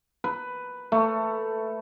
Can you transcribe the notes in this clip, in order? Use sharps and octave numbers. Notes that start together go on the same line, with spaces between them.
B4
A3